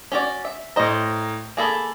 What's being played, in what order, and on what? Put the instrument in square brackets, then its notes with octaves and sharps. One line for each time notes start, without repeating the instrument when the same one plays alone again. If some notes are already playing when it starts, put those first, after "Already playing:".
[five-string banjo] C#4 F#4 D5
E5
[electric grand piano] A2 A#5 [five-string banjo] C5 D#5
[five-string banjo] A#3 G#4 A4 [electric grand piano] G#5 B5